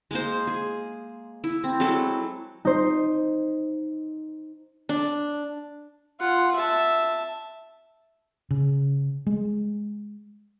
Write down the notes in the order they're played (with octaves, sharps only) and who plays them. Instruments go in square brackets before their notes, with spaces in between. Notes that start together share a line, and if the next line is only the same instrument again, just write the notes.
[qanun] G#3 A#3 C5
G#4
E4
C4
F#3 G#3 E4 A4
[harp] D#4 C5
[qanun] D4
[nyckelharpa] F4 F#5
E5 A5
[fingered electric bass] C#3
G#3